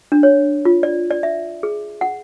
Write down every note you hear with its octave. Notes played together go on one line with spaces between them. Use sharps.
D4
C#5
F4
D5
D5
E5
G#4
F#5